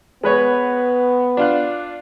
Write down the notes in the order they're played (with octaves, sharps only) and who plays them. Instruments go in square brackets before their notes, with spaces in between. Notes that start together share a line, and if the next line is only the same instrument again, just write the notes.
[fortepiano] G#3 B4 C#5 [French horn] B3
[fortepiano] D4 F4 F#6